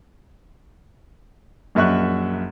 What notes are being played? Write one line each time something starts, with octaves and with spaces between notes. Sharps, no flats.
A#1 F#2 D#5 E5 C#6 F#6